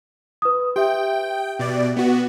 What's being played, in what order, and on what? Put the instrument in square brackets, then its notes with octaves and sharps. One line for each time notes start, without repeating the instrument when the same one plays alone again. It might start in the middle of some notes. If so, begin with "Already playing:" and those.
[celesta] B4 D#6
[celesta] G4 E5 [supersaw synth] G5
[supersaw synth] B2 D5
B3 F#4